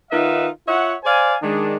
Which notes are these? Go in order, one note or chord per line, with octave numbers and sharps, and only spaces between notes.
D#3 D#4 F4 B4 E5 F#5
F4 C#5 E5 F#5
C5 D5 F5 G#5
D#3 G#3 D4